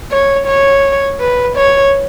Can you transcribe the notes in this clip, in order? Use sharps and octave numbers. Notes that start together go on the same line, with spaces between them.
C#5
C#5
B4
C#5